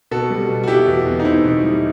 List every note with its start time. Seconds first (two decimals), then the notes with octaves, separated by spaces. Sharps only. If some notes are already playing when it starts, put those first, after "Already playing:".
0.11 B2 F#4 A4
0.30 G3
0.49 B2
0.64 F#4
0.68 B2 E4 G4
0.87 E2
1.06 E2
1.20 D#4
1.24 E2 C4 E4
1.44 B2
1.63 G3